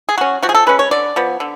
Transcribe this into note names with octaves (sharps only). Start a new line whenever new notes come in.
G#4
F#3 C#4 F#4
F3 F#4
G#4
A4
G#3 C#4 B4
C#5
D3 D5
F3 B3
D3